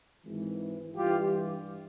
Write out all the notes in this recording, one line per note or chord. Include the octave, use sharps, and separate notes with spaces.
G#1 G#2 E3
G2 E3 G3 F4 G4